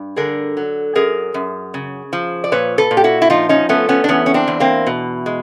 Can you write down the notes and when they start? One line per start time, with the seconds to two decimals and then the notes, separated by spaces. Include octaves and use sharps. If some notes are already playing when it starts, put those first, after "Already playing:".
Already playing: G2
0.16 D3 G#4 A#4
0.57 F#3
0.95 F#2 G#4 A#4
1.34 F#2
1.74 C#3
2.13 F3
2.44 D5
2.52 A#2 B4 C#5
2.78 A4 B4
2.91 A#2
2.97 G4
3.04 E4 F#4
3.22 E4
3.30 F3 D#4 F4
3.49 C#4 D#4
3.69 A3 B3 C#4
3.89 B3 C#4
4.04 D4
4.08 E2 B3 C#4
4.26 C#4
4.34 C4 D4
4.48 E2
4.60 A#3 C4
4.87 B2
5.26 G#3